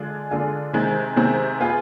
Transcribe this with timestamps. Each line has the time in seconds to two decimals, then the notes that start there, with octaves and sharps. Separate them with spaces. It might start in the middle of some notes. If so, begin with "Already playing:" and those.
Already playing: D3 G#3 D4 F4 G#4
0.31 D3 G#3 D4 F4 G#4
0.73 C3 D#3 G#3 C4
1.16 C3 D#3 G#3 C4
1.60 B3 F4 G#4 B4